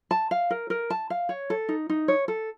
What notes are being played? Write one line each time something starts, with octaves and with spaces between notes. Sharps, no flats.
A5
F5
A#4
A#4
A5
F5
C#5
A4
D#4
D#4
C#5
A4